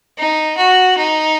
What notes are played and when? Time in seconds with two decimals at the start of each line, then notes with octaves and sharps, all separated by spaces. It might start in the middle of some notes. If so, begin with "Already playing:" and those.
0.18 D#4
0.58 F#4
0.98 D#4